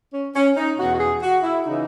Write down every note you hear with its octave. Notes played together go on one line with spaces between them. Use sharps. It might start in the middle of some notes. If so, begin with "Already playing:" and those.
C#4
C#4
D#4
E2 B2 F#4
F#4
G#4
F#4
E4
C#3 E3 D#4